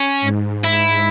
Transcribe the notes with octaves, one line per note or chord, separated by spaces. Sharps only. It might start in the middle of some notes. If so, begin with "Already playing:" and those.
Already playing: C#4
G#2
E4